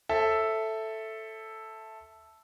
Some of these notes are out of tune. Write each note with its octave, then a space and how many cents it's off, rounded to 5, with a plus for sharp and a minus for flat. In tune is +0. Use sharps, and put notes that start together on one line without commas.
A4 +0 C5 +45 E5 +0